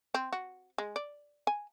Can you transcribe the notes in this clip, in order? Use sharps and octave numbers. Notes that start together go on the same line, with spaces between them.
C4
F#4
G#3
D5
G#5